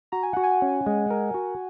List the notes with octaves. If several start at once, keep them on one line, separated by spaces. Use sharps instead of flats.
F#4 A#5
G#5
F#4 F#5
G#5
C#4
G#3
A#4
F#4